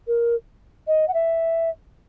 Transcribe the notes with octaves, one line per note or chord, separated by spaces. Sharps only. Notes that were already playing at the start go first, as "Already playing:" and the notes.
A#4
D#5
F#5
E5